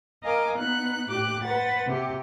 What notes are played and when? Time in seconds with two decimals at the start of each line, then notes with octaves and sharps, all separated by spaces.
0.22 A#4 D#5 F5 G#5 D6
0.58 B3 D#4 F#6
1.09 A2 G4 D6 F#6
1.43 B4 C5 F#5 A6
1.87 C3 G4